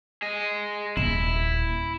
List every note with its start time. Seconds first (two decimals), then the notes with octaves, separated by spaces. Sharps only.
0.22 G#4 D#5
0.97 D#1 E4